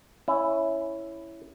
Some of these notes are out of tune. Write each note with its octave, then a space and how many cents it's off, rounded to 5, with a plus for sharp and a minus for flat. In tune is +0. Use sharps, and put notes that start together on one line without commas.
C#4 +0 E4 +0